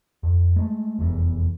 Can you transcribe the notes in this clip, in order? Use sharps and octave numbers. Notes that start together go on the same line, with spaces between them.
F2
G#3 A3
F1 E2